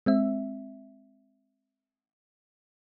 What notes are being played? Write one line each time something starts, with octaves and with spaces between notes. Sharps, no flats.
G#3 C4 E5